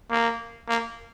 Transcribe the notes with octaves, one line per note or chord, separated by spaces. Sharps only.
A#3
A#3